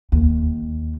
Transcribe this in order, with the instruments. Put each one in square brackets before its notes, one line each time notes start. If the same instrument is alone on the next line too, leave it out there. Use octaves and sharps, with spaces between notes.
[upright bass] D#2